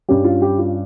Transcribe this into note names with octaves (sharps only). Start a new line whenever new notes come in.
G2 G3 C#4 G4
F4
G4
F4